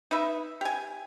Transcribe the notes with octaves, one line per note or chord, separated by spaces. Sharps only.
D#4 B4 E5
G4 G#5